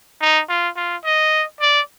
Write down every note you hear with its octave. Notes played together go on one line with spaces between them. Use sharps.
D#4
F4
F4
D#5
D5